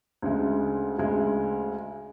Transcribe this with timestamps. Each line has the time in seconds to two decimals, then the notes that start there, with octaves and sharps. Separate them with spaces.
0.22 D2 C#3 G#3
0.98 D2 C#3 G#3